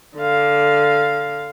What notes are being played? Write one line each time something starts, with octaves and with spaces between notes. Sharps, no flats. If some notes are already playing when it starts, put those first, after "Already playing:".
D3 F5